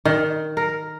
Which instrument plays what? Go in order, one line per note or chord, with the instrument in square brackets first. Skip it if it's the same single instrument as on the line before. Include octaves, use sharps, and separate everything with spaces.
[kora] D#3
A#4